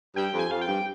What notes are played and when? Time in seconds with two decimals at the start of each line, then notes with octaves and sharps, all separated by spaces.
0.16 G2 G5
0.33 F2
0.39 G#5
0.51 F2 F5
0.61 G5
0.67 G2